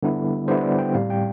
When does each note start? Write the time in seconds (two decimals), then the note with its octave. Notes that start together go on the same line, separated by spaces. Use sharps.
0.03 D3 G3 B3 E4
0.48 D3 G3 B3 E4 C5
0.63 D5
0.79 G5
0.94 A2 G3 C4 F5
1.10 G5